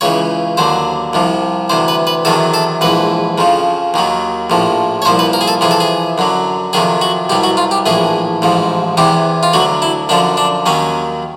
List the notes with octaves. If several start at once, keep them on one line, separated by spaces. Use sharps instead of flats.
C#2 C#3 E3 C#5
D#2 D3 F#3 C5
C2 C3 F3
D2 C3 E3 C5
B4
B4
E2 C3 D#3 F#3 A4
A4
A#1 G#2 E3 B4
F2 C#3 F3
D#2 D#3 F#3
A#1 A2 F3
C#5
C2 A#2 F3 C5
B4
A#4
G#4
A4
F2 C3 E3 G#4
A4
G#4
F#2 D3 F#3
F2 C3 D#3 F#3 G#4
F#4
C2 B2 F#3 G4
F#4
F4
G4
A#1 A2 E3 G#4
A1 G#2 F3
E2 C3 E3 G4
F4
D2 D3 F#3 F#4
E4
F#2 D3 F3 D4
D4
D#2 D#3 F#3 C#4